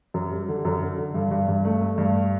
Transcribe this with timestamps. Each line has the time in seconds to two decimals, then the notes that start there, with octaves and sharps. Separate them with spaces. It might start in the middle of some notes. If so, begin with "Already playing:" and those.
0.14 F#2
0.31 G3
0.48 D3
0.65 F#2
0.81 D3
0.98 D3
1.14 G2
1.31 G2
1.48 G2
1.65 A3
1.81 A3
1.98 G2